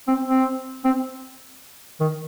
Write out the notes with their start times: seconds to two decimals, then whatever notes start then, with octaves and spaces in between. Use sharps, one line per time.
0.08 C4
0.28 C4
0.85 C4
2.01 D#3